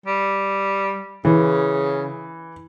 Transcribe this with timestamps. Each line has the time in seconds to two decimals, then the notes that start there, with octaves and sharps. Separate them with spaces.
0.06 G3
1.25 C#3 E3